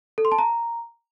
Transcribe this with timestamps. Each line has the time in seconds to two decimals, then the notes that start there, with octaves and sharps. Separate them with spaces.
0.18 A4
0.25 C6
0.32 A5
0.38 A#5